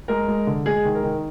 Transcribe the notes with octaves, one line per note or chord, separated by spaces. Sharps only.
G#3 A#4
G#3
D3
G#3 G#4
D#3
A#4
D#3